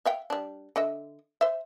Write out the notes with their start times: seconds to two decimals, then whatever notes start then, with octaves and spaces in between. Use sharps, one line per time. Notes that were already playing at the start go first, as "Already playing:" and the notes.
0.05 E5 F5 G5
0.30 G3 D4
0.76 D3 D#5 E5
1.41 C5 E5